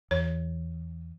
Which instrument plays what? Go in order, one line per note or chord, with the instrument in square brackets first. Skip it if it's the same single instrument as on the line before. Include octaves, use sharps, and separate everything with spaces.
[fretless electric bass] E2 [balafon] C#5